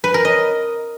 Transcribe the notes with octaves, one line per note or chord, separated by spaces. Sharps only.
B4
A#4
D#5